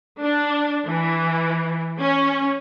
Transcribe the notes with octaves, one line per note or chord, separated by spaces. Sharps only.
D4
E3
C#4